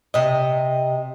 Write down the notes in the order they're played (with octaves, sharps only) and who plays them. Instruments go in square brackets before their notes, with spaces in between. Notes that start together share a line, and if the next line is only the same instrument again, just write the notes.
[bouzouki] C3 D#5